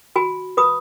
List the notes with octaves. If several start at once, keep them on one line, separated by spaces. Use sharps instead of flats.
F#4 G#5 B5
B4 B5 D#6